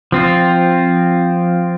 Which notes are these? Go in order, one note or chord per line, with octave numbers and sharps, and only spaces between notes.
F3 C4 F4